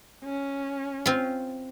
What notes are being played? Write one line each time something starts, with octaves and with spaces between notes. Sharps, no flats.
C#4
C4 F4